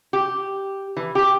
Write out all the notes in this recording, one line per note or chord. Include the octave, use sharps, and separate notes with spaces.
G4
E3
G4